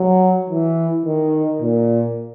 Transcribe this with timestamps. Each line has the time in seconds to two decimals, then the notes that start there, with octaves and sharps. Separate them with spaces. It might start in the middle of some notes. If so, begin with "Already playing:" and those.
Already playing: F#3
0.49 E3
1.05 D#3
1.62 A#2